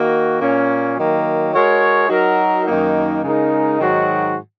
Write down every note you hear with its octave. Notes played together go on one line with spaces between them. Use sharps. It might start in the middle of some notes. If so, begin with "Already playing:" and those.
Already playing: D#3 A#3 F#4
A#2 A#3 C#4
D#3 F#3 A#3
G#3 F#4 A#4 C#5
F#3 D#4 F#4 A#4
F#2 D#3 A#3 D#4
C#3 G#3 D#4 A#4
G#2 D#3 F#3 D#4 F#4